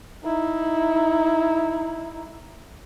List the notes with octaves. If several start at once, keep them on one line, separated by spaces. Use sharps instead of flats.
D#4 E4